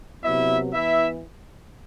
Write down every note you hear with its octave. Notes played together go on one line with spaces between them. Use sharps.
C3 F#3 B3 E4 E5
E3 B3 E4 E5